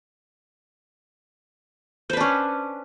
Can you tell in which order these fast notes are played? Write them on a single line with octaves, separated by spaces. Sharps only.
C5 B4 D4 C#4